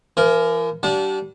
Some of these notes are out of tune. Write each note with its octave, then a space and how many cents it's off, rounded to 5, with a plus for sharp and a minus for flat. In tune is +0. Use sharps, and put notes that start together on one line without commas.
E3 +45 A#4 +0
G3 -30 D4 -20 F#5 -45